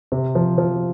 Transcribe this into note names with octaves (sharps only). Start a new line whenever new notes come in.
C3
F3
F3